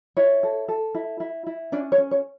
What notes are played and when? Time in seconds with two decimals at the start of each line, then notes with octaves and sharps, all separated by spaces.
0.17 E4 C#5
0.43 A4
0.68 A4
0.95 E4
1.20 E4
1.46 E4
1.72 C#4 D4 D5
1.92 C#5
1.98 C#4
2.11 C#5